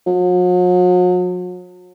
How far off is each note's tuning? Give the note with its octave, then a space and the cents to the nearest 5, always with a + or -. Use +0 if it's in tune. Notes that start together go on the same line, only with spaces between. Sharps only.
F#3 -45